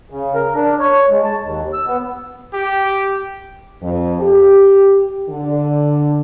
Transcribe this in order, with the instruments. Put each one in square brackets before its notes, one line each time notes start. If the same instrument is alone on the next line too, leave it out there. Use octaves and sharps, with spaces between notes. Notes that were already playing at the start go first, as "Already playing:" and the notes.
[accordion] C#3
A#4
D4
C#5
G#3
A5
D#2
E6
B3
[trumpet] G4
[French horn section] F2
G4
D3